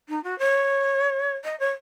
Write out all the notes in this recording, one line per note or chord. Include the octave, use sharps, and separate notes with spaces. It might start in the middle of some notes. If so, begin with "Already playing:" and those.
D#4
F#4
C#5
D#5
C#5